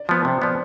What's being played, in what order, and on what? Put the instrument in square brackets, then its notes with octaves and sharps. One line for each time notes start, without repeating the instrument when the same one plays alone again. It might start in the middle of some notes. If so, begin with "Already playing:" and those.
Already playing: [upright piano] D5
[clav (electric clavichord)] F3 B3
[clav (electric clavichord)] C3 [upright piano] C5
[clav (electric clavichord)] F3 B3 [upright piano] D5